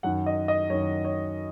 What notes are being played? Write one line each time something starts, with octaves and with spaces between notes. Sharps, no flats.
F#2 D#3 F#5
D#5
D#5
F#2 D#3 C#5
C#5